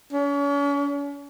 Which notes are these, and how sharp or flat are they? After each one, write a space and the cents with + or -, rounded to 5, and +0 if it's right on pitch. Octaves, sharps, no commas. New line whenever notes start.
C#4 +40